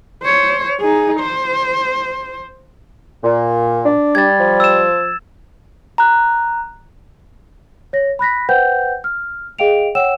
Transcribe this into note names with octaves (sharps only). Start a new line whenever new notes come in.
C5 C#5
D#4 G#4
C5
A#2
D4
G3 G#6 A6
F3
E6 E7
A#5 F#6
C#5 A#6
B5 F#6 A#6 B6
B4 C5 F#5 G5 G6
F6
G#4 D#5 F5 G5 D7 F7
C#5 F#5 G5 E6 E7